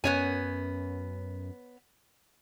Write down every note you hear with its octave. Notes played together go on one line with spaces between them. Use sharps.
F#2 B3 C#4 C#5 G#5